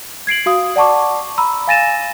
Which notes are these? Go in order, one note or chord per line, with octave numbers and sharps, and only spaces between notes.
G#6 C7 D7 F#7
F#4 F5 D#6
D5 F#5 A5 C#6 D6
A#5 B5 E6
F5 G#5 A6 A#6 D#7 E7